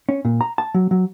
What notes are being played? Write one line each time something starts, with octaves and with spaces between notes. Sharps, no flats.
C#4
A#2
A#5
A5
F#3
F#3